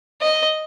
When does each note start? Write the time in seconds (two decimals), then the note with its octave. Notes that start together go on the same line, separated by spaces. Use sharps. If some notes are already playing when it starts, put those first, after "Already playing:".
0.22 D#5